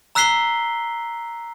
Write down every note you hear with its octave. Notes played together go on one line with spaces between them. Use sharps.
A#5 E6 F#6 B6 C7 G7